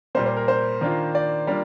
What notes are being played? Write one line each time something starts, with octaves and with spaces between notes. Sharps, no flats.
A#2 G3 A#3 C5
C5
A#4
C5
D#3 A#3 D4 F4
D5
G3 A#3 D4 F4